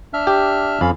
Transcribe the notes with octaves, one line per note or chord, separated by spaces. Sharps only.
D4 E5 F6
G4
F2 C#4 F5 B5